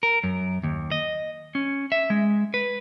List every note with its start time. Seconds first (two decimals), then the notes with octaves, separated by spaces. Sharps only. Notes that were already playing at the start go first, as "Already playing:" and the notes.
0.03 A#4
0.24 F#2
0.63 D#2
0.92 D#5
1.55 C#4
1.92 E5
2.10 G#3
2.54 B4